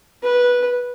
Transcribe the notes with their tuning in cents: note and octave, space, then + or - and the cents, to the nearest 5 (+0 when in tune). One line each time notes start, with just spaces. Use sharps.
B4 -10